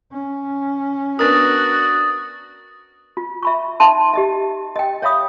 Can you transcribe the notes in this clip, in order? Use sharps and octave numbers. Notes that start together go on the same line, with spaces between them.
C#4
B3 D4 F#4 A#4 D#6 A6
F4
E5 B5 C#6
D#4 E5 A5 C6
G4 D#5 E5
D#5 G5
C#5 E5 F5 B5 D#6